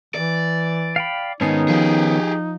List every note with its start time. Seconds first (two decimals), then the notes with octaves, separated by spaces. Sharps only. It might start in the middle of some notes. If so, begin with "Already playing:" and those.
0.15 E3 D5
0.96 F5 G5 B5
1.41 G#2 D#3 B3 C#4 D#4 G#5 A5 C7
1.68 F3 G4 G#4